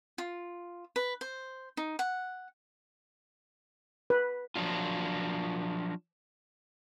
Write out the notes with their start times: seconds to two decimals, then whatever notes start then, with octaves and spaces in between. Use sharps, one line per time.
0.18 F4
0.96 B4
1.21 C5
1.77 D#4
1.99 F#5
4.10 B4
4.56 F3 F#3 D4 F4